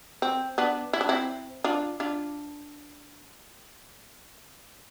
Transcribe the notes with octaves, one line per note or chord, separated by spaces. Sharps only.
C4
B3 D4
E4
D4
C4 E4
D4 F4
D4 F4